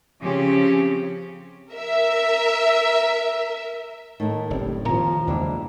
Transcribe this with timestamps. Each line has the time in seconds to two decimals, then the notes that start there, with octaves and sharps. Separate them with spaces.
0.21 C#3 F3 C4 C#4 G4
1.72 A#4 E5
4.20 A2 D#3 A#3
4.50 F#1 G3 C4
4.86 D2 A#2 D#3 F3 A#5
5.27 E2 G#2 C#3 G3 A#3 D4 E4